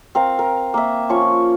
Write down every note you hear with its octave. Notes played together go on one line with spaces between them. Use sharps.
C4 A#4 F5
A#4
A#3 E5
F3 C#4 C#6